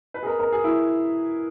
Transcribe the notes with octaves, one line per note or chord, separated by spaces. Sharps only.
B4
G#4
A#4
A#4
G#4
E4